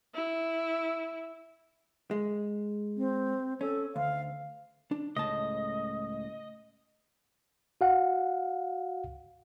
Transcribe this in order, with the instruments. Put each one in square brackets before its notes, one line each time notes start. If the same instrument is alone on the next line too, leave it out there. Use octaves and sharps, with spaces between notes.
[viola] E4
[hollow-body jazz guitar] G#3
[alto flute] C4
[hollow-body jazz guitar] C#4 [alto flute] A4
[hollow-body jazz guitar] D2 [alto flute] F5
[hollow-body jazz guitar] D4
[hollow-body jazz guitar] C#2 A2 A5 [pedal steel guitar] D#5
[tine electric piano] F#4 F5 F#5